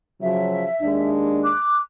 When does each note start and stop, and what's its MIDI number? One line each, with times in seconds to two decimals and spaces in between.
0.22 0.66 49
0.22 0.66 53
0.22 0.66 54
0.22 1.08 76
0.82 1.52 39
0.82 1.52 56
0.82 1.52 62
1.44 1.79 86
1.44 1.79 90